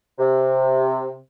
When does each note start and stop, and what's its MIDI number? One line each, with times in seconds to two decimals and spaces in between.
0.19 1.15 48